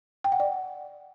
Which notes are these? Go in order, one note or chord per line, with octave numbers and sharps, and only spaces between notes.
G5
F#5
D5